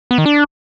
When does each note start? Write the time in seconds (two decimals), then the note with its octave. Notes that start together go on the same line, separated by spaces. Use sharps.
0.11 B3
0.18 D#3
0.26 D4